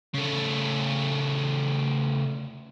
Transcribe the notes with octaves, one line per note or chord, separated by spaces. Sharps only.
C#3 A3